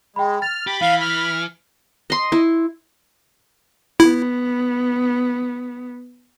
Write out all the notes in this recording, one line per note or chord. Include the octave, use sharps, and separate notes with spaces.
G#3 G5 B5
F6 A6
G4 B5
E3 F5
F6
D#5 C6
E4
B3 E4